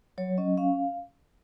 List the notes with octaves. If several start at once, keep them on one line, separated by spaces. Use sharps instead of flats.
F#3 C#5
C#4 D#5
C#4 F5